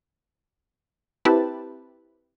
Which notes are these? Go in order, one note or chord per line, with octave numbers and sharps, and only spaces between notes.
C4 E4 G4 B4 A5